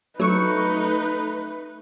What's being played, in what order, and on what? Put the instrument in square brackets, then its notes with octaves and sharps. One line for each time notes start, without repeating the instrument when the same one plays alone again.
[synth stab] F#3 C#6 [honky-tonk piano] A3 [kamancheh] D#4 [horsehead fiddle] B4